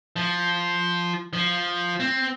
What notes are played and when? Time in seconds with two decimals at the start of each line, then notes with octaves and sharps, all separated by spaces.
0.16 F3
1.33 F3
2.00 C4